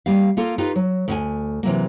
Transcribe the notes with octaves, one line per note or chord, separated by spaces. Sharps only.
G3 A#3 F5
A#3 F4 A4 A#4
D#4 F4 G4 B4
F#3
D2 G5 G#5
C3 E3 F#3 A#3